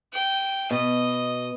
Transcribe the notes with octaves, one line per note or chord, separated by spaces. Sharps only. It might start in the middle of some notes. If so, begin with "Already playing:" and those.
G5
B2 D#5